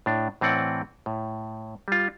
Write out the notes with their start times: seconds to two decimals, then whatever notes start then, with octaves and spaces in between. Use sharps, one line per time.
0.06 A2 D4
0.41 A2 E3 C4 D5 F#5
1.06 A2
1.88 G3 F4